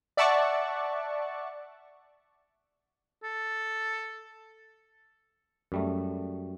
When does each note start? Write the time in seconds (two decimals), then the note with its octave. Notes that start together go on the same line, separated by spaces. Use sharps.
0.17 D5 E5 F#5 A5 C#6
3.23 A4
5.72 F#2 G3 A3